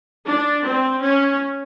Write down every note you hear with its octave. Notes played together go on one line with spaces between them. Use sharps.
D4
C4
C#4